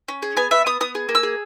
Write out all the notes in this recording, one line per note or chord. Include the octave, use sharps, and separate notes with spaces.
C#4
G#4
B3 G#5
B3 E5
B3 D#6
B3 D#6
G#4
A#3
E6
G#4